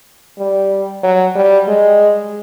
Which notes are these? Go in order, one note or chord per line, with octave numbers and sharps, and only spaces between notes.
G3
F#3
G3
G#3